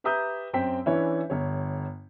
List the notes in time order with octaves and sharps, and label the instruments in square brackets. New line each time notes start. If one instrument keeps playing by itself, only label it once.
[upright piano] G4 B4 E5 A#5 D#6 G6
F#2 C4 G5 B6
E3 C#4 D4 E4 B4 C#5
G1 C#5